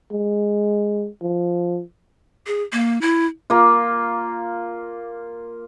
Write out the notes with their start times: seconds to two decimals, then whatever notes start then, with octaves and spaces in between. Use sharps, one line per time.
0.12 G#3
1.22 F3
2.47 G#4
2.73 A#3
3.01 E4
3.50 A#3 F4